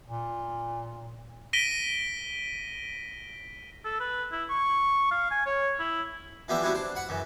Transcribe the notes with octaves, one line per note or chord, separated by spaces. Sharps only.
A#2
A#6 B6 D7 D#7 G7
A4
B4
E4
C#6
F5
G#5
C#5
E4
E3 F3 G3 B3 D4 E5
G3 B3 C4 D4 E4 F#4
D4 C5
F#5 B5
F#2 C#3 E3